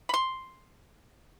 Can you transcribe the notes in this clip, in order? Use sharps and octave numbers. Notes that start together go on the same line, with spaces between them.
B5 C6